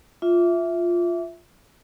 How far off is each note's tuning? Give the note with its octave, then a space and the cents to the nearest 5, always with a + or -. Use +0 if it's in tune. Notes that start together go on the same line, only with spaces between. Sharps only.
F4 +0 E5 +0 D6 -25